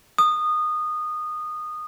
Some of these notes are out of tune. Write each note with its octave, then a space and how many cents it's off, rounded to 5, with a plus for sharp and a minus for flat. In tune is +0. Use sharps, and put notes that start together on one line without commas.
D#6 -20